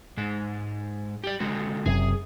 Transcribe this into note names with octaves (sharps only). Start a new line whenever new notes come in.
G#2 G#3
G4 D5
D3 G#3 F#4
F#1 F#2 C3 G#4